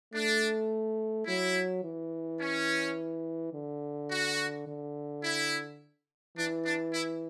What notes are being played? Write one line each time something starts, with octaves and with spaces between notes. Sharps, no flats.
A3 D4
F#3 E4
E3
C#4
D3
F#4
D3
E4
E3 D4
D4
E4